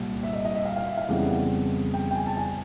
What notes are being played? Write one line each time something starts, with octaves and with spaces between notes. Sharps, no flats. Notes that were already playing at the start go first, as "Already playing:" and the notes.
Already playing: C2 A#2 G3
E5
D#5
D#5
E5
F5
F5
E5
F5
F2 C#3 E3 G3 B3 F#5
G5
G5
G#5
A5
G#5